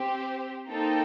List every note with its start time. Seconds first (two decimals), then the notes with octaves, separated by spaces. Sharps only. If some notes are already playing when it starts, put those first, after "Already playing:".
Already playing: C4 G4 C5
0.69 A#3 D#4 A4 C5 G5